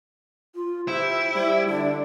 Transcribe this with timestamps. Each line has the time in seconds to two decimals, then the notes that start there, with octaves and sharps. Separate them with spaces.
0.55 F4
0.88 E4 G4 C5 E5
1.34 G3 E5
1.69 D3 D4 D5